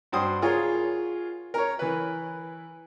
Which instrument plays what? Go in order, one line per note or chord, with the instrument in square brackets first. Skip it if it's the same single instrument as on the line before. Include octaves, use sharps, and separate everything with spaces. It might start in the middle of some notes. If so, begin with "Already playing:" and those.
[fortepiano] G2 F#4 C5 G5 D#6
F4 G#4 A#4 C#5
A#4 C#5
E3 B4